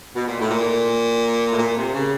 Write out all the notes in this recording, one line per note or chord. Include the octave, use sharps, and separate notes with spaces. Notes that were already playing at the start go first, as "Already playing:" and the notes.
B2
A#2
A2
A#2
A2
A#2
C3
C#3